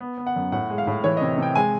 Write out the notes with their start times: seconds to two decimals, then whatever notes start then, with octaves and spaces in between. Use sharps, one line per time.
0.01 B3
0.18 B3
0.26 F#5
0.36 F#2
0.52 A2 F#5
0.70 G#3
0.78 F5
0.87 A2
1.04 E3 C#5
1.17 D#5
1.22 C3
1.38 C3 G5
1.55 G#3 G#5